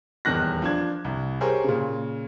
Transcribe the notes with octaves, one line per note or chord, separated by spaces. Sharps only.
D#1 E2 D#3 F#6 A#6
F3 D4 G#6
C2
G4 G#4 A#4 C5 C#5
A#2 C#3